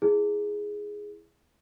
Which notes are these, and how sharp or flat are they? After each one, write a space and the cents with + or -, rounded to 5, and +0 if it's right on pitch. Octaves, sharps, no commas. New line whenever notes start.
E4 +0 G#4 +0